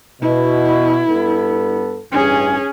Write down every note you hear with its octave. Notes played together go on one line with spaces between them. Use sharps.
B2 E4
G2 B3 A4
A1 G2 C#4 G#4